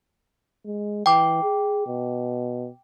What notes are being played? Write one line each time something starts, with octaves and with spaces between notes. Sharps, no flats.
G#3
E3 G5 D6
G#4
B2